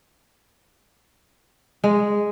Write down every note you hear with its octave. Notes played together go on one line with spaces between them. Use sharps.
G#3